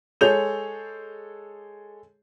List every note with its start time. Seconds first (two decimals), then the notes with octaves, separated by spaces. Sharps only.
0.21 G#3 G#4 A4 C#5 G6 F7